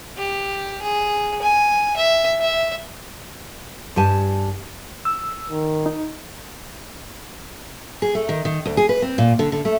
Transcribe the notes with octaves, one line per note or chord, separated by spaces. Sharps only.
G4
G#4
G#5
E5
E5
G2 G4 G#5 A5
E6
D#3
D#4
G#4
A3
D#3
D#3
D2
G#4
B4
C4
A#2
D3
D3
A3